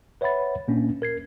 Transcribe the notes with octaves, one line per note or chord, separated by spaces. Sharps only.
B4 C#5 E5 F#5 B5 A6
A#2 A#3 C#4 D4
A#4 G#6 C7